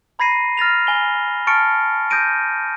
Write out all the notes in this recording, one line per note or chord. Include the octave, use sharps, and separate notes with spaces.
A#5 B5 G#6 A#6 C7 D#7
F6 A6 A#6 F7
G#5 G7
A5 C#6 F6 A6 C#7 D7
D#6 G6 G#6 A#6 D7 D#7